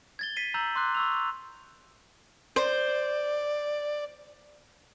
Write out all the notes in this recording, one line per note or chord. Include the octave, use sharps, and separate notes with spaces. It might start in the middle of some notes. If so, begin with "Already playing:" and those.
G#6 A6 G7
B6 C7 D#7
A#5 E6 G6 A6 F#7
C6 D6 F#6 C7
C#6 E6 F7
C5 D5